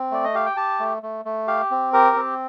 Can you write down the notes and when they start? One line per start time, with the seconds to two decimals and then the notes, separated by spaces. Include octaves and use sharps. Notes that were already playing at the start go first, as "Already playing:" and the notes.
Already playing: C4
0.11 A3 D5
0.24 D#5
0.34 G4 F5
0.46 G5
0.57 G4 A5
0.80 A3
1.03 A3
1.25 A3
1.47 G4 F5
1.71 C4
1.93 G4 A#4
2.16 C4